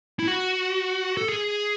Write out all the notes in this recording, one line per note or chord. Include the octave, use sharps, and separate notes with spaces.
E4
F#4
A4
G#4